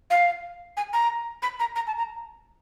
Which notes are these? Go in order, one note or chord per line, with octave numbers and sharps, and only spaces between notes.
F5
G#5
A#5
B5
A#5
A#5
A5
A#5